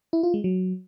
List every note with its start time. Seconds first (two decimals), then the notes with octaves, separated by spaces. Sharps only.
0.13 E4
0.23 F4
0.34 G#3
0.44 F#3